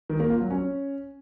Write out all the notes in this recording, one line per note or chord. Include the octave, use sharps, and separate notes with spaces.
D#3
A#3
F4
F#3
C#4